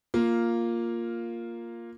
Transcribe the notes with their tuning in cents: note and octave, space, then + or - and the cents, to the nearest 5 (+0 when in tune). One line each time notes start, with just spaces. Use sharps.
A#3 +0 F4 +0